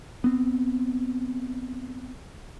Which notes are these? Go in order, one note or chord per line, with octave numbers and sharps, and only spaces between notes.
B3 C4